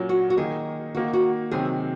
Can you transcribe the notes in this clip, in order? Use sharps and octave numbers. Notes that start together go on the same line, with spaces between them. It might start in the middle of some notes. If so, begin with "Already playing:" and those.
Already playing: A#2 F#3 C#4
F#4
F#4
D#3 A#3 D#4 G#4
D#3 A#3 D#4 F#4
F#4
C3 D#3 F#3 C4 G#4